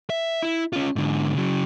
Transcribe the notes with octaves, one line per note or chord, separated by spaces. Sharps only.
E5
E4
C#4 F4
G#2 D3
C#3 F#3